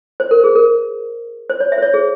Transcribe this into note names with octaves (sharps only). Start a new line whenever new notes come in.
C5
A#4
G#4
A#4
C5
C#5
E5
C5
C#5
G#4